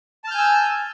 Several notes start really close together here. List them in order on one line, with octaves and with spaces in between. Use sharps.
A5 F6 G6 G#5 E6